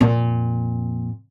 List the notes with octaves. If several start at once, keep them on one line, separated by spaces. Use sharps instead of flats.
F2 A#2